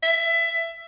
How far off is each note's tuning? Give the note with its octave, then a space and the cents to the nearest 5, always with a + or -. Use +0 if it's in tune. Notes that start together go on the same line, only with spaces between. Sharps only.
E5 +20